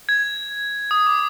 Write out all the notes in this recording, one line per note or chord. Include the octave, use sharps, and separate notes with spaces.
G#6
D#6
D6